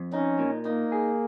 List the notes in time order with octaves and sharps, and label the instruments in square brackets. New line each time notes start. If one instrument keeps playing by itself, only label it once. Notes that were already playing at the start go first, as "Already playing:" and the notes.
Already playing: [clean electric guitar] F2
[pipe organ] C#4 [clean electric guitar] D#4
[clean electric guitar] A#2
[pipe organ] A#3 [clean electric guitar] D#4
[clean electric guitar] G#4